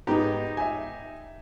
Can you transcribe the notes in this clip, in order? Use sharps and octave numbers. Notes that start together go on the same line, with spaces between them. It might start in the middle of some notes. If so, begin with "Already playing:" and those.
G#2 B3 D#4 G4 A#5
E5 G#5